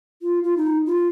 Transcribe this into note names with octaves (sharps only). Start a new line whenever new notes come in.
F4
F4
D#4
F4